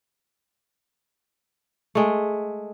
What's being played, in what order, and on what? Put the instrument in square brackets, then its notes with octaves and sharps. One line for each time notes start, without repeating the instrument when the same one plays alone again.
[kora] G#3 A3